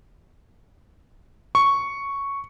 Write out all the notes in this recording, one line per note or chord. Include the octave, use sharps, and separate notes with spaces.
C#6